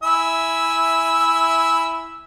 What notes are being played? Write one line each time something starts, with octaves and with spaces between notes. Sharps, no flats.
E4 E5 G#5